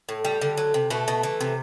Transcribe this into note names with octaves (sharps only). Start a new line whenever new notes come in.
A2
G3
D3
F#3
C3
B2 A3
B2
E3
C3